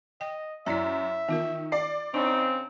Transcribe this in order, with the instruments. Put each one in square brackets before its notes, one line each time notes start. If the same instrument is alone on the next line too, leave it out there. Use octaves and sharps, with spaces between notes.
[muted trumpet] D#5 [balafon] G5
[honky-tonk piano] F#2 B6 [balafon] E4 D5 A#5 [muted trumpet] E5
[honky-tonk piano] D#3 [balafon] B3 F4 A#4
[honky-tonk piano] D5 C7
[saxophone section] C#3 C4 [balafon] D4 [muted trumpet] D#4